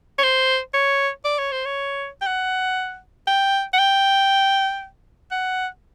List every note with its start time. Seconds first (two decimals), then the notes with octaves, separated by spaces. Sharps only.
0.19 C#5
0.23 C5
0.74 C#5
1.24 D5
1.39 C#5
1.52 C5
1.65 C#5
2.21 G5
2.27 F#5
3.27 G5
3.73 F#5
3.79 G5
5.31 F#5